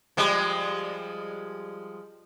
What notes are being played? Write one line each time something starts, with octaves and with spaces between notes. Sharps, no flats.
F3 G3 G#3